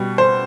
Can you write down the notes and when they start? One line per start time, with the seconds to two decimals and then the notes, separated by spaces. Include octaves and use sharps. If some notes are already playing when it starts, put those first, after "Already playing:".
Already playing: B2 G3
0.18 C5